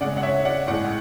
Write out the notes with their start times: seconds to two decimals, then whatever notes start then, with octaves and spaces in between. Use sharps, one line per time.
0.01 C#3 D5 F#5
0.05 G#3
0.17 F#5
0.23 C#5 E5
0.45 D5 F#5
0.67 A2 G#3 D5 F#5